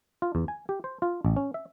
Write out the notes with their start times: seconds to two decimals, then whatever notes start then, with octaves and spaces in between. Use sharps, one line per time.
0.22 F4
0.35 E2
0.48 G#5
0.69 G4
0.84 C5
1.02 F4
1.25 A1
1.36 C#4
1.54 E5